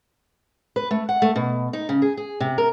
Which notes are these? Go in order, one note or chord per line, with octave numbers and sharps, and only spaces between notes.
B4
A3
F#5
A3
B2
D#4
C#3
G#4
G#4
C3
A#4